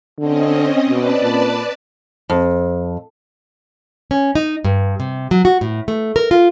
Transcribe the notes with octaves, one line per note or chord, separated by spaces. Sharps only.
D3 C4 C#4 D#5
B2 B4 D5 A5
A#2
F2
C#4
D#4
G2
C3
F#3
F#4
A2
A3
A#4
F4